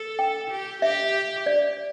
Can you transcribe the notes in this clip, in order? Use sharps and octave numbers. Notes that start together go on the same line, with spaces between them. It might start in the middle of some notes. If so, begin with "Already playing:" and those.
Already playing: A4
G5
G4
G4 E5
D5